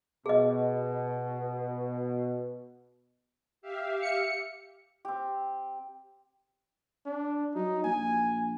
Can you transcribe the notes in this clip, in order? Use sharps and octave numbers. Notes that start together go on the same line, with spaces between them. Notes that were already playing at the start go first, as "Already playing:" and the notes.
B2 G#4 D#5
G4 E5 F5
C#7
C4 G4
D4
F#3 D#4
A#1 G#5